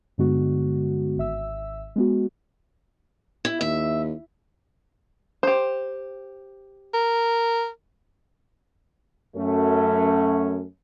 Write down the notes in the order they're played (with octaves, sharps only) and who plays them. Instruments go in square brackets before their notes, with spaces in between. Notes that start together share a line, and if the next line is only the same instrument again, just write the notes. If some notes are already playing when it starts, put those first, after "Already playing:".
[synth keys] G2 D3 G#3 B3 F#4
G#1 E5 E6
G#3 B3 F#4
[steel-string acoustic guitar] E4
[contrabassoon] D#2 [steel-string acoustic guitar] E5
[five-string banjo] G4 C5
[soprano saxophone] A#4
[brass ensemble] F#2 A3 C#4